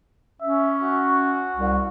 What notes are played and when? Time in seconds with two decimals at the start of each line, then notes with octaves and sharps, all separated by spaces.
0.42 C#4 E5
0.82 F#4
1.55 C2